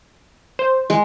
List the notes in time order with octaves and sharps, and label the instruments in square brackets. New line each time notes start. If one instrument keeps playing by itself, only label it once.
[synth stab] C5
[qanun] G#3